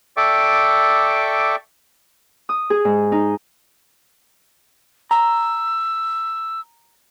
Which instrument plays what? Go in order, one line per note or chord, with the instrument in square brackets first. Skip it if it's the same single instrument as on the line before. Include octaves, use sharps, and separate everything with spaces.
[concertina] A4 D5 E5 G5 C#6 D6
[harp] D#6
G#4
G#2
D#4
[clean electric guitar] A#5 [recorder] E6